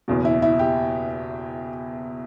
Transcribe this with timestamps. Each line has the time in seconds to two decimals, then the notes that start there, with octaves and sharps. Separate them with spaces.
0.08 F#1 E2 B2
0.25 E4
0.42 E4
0.59 G4